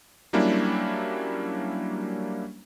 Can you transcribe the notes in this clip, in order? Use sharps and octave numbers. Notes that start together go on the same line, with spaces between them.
F#3 G3 A#3 C#4 D4 E4